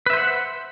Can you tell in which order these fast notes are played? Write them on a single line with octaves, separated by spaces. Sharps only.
B4 E5 C5 F#5